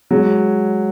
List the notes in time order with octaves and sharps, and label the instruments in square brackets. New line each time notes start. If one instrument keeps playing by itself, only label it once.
[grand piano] F#3 G#3